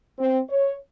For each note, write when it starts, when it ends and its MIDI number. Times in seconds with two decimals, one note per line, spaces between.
0.19 0.39 60
0.49 0.76 73